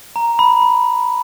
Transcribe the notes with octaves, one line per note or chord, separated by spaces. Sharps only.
A#5
B5
B5